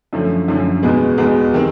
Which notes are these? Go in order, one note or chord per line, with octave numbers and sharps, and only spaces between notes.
F#2 D3 F3 A3 C#4
F#2 D3 F3 A3 C#4
E2 B2 G#3 B3
E2 B2 G#3 B3
D#3 G3 C4